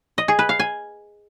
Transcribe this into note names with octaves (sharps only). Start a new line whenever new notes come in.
D#5
G#4
B4
F5
G#5